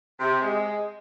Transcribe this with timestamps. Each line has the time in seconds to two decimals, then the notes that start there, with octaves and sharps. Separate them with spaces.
0.20 C3
0.42 G#3